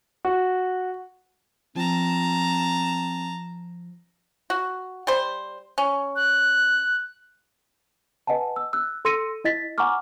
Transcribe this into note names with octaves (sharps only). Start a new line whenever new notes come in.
F#4
F3 C4 A5 A#5
F#4
G3 C5
C#4
F#6
B4 D#5 F#5 G#5 A5
E6
E6 F#6
A4 C6 E6 A#6 C#7 D#7
E4 D#5 A6 B6
F#5 G#5 A#5 C#6 D6 F6